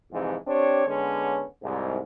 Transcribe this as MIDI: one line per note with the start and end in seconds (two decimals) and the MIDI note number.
0.12 0.36 41
0.12 0.36 44
0.12 0.36 48
0.12 0.36 52
0.47 0.84 60
0.47 0.84 62
0.47 0.84 67
0.47 0.84 73
0.87 1.44 50
0.87 1.44 56
0.87 1.44 59
0.87 1.44 61
0.87 1.44 73
1.62 1.99 36
1.62 1.99 44